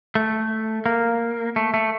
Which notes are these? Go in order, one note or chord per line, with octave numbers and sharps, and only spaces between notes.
A3
A#3
A3
A3